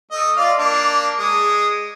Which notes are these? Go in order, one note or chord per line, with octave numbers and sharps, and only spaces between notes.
A3 D#5
F4 D5 F5
A#3 D4 F5
G#3 D#6